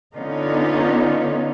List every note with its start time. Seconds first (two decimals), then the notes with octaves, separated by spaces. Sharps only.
0.16 D3 B3 C#4 D#4 F4